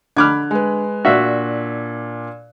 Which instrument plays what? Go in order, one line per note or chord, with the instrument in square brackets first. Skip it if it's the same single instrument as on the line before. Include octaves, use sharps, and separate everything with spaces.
[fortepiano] D3 D6 F6 [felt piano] B5 F#6 G#6
[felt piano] G#3 B4
[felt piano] A#2 D4 [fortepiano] F#4 E5 F5